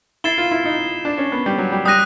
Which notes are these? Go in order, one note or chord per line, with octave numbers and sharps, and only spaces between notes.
E4 A6 C7 E7 G7
F4
E4
D#4
D4
C#4
B3
G3
F#3
G3
G3 D#6 F#6 A#6 D#7